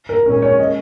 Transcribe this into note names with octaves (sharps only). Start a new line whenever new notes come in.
A#4
A#2 G#3 C#4 A#4
C#5
D#5